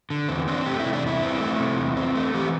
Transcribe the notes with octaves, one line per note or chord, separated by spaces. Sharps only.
D3
E2 C4
C4 D4
A3 G4
E4
C3
D4
E2 E4
C4
A3
C3
E2
C4
A3
E3 G4